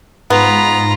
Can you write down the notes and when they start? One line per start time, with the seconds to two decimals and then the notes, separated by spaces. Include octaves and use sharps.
0.30 G#2 B3 F4 A#5 B5